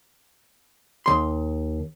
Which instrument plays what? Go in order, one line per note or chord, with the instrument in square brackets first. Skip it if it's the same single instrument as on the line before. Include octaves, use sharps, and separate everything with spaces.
[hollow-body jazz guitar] D#2 C6